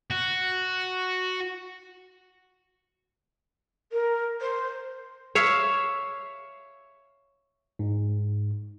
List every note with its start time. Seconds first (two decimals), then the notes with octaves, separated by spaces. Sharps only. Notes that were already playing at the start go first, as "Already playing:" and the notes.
0.10 F#4
3.92 A#4
4.40 C5
5.35 C#5 E5 F5
7.79 G#2